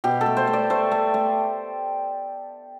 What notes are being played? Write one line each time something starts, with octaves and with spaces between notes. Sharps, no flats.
B2 G4
A4
A3
C5
A3
D5
A3 C5
A3
A3